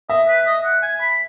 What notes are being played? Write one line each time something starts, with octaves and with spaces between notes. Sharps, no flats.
D#5 E5
B4
D#5
F#5
G#5
B5